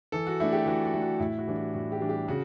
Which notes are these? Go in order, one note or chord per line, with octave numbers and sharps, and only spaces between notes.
E3 A4
F#4
A3 D4 E4
G4
E3 F#4
F#4
A3 D4
F#4
A2 E4
F#4
E3 G3 D4
F#4
A2 F#4
G4
E3 G3 D4
G4
C#3 F#4